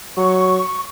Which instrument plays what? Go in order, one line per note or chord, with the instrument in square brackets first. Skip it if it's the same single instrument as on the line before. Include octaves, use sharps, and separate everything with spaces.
[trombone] F#3 [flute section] C#6